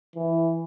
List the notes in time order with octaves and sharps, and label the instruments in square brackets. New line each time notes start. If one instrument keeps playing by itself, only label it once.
[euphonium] E3